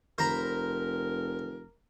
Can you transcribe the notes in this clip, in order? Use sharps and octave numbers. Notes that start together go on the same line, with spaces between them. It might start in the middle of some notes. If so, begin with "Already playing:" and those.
F1 A#4 C5 A#5 B5